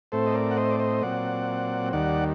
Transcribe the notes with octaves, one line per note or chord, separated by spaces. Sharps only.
A2 A3 C4 A4 C5
D#5
A#4 D5
F#5
C5 D#5
D5
C5 D#5
A#2 F#3 C4 D5 F#5
D#2 D#3 G3 D5 F#5